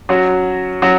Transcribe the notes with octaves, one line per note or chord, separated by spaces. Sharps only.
F#3 C#4 F#4
F#3 C#4 F#4